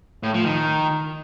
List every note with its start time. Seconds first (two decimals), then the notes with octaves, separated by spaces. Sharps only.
0.23 A2
0.34 F3
0.46 D#3